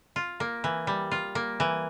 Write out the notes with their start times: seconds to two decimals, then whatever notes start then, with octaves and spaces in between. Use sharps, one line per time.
0.16 F4
0.40 A#3
0.64 E3
0.87 G3
1.11 F4
1.35 A#3
1.60 E3